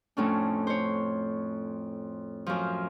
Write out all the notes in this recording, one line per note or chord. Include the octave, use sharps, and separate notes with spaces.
F2 A2 C#4 D4
C5 C#5
F#2 F3